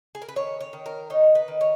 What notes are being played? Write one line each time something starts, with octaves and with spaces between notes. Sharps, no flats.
G#4
A#4
B4
D#3 C#5
C#5
D#3
A#4
D#4 C#5
B4
D#3
C#5